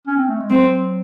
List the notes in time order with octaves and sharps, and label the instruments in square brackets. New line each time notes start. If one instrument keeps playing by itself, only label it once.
[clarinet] C#4
C4
A3
G#3
[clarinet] F#3 [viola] C4